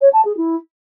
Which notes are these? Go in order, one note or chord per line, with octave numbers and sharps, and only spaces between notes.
C#5
A5
G#4
E4